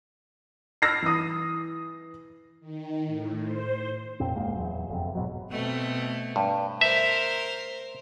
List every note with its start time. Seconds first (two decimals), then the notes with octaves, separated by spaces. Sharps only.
0.82 B5 E6 F6 A#6 C7
1.02 E3 D#6
2.60 D#3
3.07 A2
3.42 C5
4.20 F2 A#2 C4
4.36 D#1 G#2 G#3 A#3
4.56 E2 F#3
4.88 G1 F2 C3
5.15 G#2 B2 F#3
5.50 B2 A3 C4
6.36 G2
6.81 A#4 C5 E5